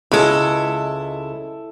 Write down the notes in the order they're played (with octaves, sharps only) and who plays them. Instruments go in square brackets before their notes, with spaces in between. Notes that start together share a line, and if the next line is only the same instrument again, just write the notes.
[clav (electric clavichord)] C#2 G#3 [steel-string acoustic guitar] E4 A4